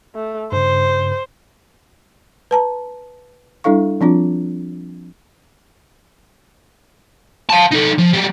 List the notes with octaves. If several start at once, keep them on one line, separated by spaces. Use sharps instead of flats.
A3
G2 C#3 C5
B4 A5 A#5
G3 D4 E4 A4 F5 C#6
F3 C4 D4 F4
F5 A5
D#4 A4
F3
F#3 G3